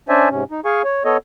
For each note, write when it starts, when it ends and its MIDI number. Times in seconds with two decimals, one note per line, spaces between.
0.09 0.29 61
0.09 0.29 62
0.09 0.29 72
0.09 0.29 74
0.09 0.29 76
0.09 0.29 80
0.30 0.44 44
0.30 0.44 48
0.30 0.44 61
0.51 0.60 63
0.65 0.82 68
0.65 0.82 77
0.65 0.82 80
0.65 0.82 85
0.84 1.04 73
1.05 1.17 59
1.05 1.17 69
1.05 1.17 73
1.05 1.17 75